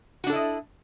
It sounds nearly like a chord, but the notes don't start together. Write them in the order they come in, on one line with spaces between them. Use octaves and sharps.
F#4 D4 A4 E4 D#5